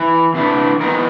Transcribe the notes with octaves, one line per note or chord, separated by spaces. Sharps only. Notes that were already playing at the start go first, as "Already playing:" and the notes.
Already playing: E3
C3 E3 A3 D4
E3 G#3 B3 D#4 A#4